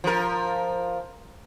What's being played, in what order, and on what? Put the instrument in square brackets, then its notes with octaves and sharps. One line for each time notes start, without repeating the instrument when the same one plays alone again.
[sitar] F3 A#4